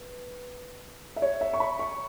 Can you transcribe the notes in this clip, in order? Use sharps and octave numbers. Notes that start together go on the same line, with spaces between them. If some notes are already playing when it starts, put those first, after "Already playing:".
Already playing: B4
E5
C#5
E5
C#6
B5
C#6